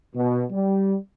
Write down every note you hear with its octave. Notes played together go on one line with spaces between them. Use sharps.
B2
G3